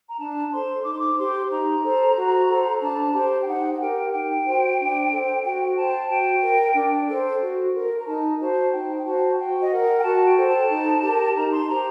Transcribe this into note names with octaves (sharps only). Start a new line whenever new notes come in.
A#5
D4 A5
A4 C5 C6
D#4 D6
C6
D6
G4 C5 C6
D#4 A#5
A4 C5
F#4
A4 C5
D4 A5
G4 C5
G5
D#4 F#5
F#5
G4 A#4 G5
D#4 G5
F#4 C5
D4
A4 C5
F#4 G5
C5 A5
F#4 G5
A#4
D4
A4 C5
F#4
A#4
A#5
D#4 A5
F#4 C5 A5
D#4 G5
G5
F#4 C5 A5
F#4 G5
D#5
A#4 F#5
G5
F#4 A5
G5
A4 C5
A5
D#4
G4 A#4
D#4 A#5
C6
A5
G4 C5 A#5